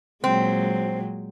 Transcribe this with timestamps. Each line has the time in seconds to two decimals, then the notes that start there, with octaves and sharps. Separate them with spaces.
0.24 A#2 F#3 G#3 C4